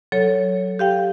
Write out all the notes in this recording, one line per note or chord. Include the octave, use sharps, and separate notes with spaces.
F#3 A4 C#5
G4 F5 G5